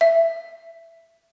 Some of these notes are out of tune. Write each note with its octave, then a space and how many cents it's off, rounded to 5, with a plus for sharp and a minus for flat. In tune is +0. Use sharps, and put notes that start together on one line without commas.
E5 +10